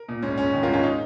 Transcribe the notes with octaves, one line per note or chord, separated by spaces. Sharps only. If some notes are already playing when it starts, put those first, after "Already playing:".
Already playing: A#4
A#2
G#2 C#4
G#3 C#4
D#3
F4 A#4
G#2
C#4 F4
D#4